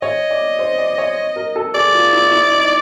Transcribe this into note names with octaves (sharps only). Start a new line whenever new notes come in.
C#5 D#5
D5
C5
D5
C#5
A#4
A4
G#4 D5
F4
E4
E4
D#4